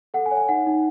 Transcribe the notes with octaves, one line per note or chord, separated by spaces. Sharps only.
A4 F#5
G#5
C#5
G#5
D#4 F#5
D#4